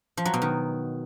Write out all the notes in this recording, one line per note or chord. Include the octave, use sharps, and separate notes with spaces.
F3
F#3
B2
D#3